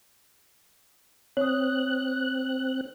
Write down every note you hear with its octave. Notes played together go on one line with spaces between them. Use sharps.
C4 C#5 D#6 F#6